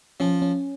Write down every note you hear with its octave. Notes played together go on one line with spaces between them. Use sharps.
F3 C#4
C#4